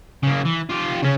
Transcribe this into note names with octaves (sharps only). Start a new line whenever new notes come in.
C#3 A#3
E3
F4 G4
C#3 C#4